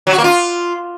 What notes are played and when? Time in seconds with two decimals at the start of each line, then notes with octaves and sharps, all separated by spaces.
0.07 F#3
0.13 F#4
0.18 A#3
0.24 F4